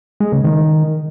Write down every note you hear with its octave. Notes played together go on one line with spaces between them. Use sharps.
G#3
C#3
D#3